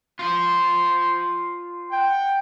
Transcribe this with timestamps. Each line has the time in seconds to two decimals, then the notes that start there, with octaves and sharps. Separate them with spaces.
0.19 F4 C5
1.92 F#5 G5